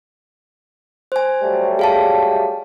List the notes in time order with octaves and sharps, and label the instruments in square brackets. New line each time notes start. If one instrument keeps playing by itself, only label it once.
[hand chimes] C5 G#5
[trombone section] F#3 G3 A3
[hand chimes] G#4 F5 A5